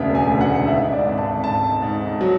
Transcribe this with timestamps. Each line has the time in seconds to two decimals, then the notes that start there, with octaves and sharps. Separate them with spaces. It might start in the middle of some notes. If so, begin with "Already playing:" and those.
Already playing: E1 D2 C#3 E5
0.15 G#5
0.28 D2
0.41 F#5
0.67 G#2 E5
0.92 D5
1.05 G#1
1.18 A5
1.44 G#2 A5
1.82 G#2
2.21 F#3